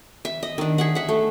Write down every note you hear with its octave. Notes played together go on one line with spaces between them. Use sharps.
E5
D#5
D#3 D4
G#4 E5 F#5
E5 F#5
A3